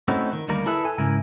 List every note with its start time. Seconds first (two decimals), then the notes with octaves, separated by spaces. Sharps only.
0.08 A3 C4 C#4 D#4 E4 F#4
0.33 D#3
0.48 D2 D#3 G3 A#3 A#4
0.66 E4 G#4 A4 B4 E5
0.85 A4 G#5
0.98 C#2 G#2 C#3 E4 A#4 G#5